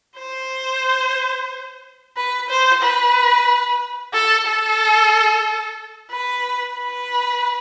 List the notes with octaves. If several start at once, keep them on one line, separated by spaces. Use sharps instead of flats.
C5
B4
C5
B4
A4
A4
B4
B4